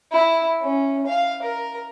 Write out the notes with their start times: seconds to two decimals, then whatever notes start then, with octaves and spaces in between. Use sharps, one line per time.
0.12 E4
0.62 C#4
1.07 F5
1.43 A#4